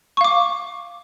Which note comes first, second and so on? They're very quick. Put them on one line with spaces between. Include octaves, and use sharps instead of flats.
C#6 F5 D6